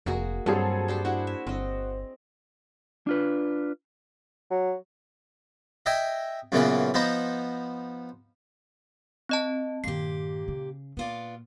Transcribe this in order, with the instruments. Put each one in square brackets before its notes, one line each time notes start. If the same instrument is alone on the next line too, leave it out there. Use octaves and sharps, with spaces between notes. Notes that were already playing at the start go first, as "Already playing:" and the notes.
[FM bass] F1 [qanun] A#3 F#4 G#4
[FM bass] G2 [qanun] F#3 C4 [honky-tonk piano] G3 G#4 A4
[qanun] D4 G4 C5
[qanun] D4 E4 G#4 [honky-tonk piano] F#4
[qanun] E5
[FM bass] G1 [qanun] C4 D#5
[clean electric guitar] D4 F4 B4
[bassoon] F#3
[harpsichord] D#5 E5 G5 G#5
F#2 A#2 C#3 E3 B3 F4
F3 B3 D#4 C5 A#5
[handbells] C4 D#5 A5
[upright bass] G2 D#3 [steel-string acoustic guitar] A#2 G4 [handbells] C7
[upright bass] C#3
[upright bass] A#2 [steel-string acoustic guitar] B3 F4 D5